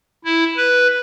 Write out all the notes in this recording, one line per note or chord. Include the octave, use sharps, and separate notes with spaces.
E4
B4